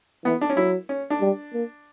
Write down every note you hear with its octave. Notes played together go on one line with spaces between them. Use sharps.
E3 B3
D4
C#4
F#3 E4
C#4
D4
G3
A#3